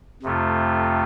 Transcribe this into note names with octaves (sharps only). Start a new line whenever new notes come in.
F2 C3 A3 F4